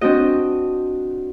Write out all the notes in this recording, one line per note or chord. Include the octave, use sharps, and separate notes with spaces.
C4 D4 F#4 D#5